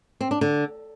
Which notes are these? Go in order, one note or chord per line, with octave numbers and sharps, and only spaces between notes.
C4
D4
D3